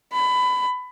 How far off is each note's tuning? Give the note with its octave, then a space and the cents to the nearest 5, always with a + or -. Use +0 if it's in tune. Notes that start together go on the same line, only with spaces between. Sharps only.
B5 +20